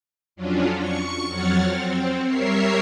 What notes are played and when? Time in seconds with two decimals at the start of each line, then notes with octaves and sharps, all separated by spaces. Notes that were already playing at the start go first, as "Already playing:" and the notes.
0.36 F2 F#3 C#4 D4 F4
0.75 C#6 C#7
1.28 F2 F#3 C#5 F#5 F6 A6
1.62 C4
2.26 G3 A#4 C#5 E5 C7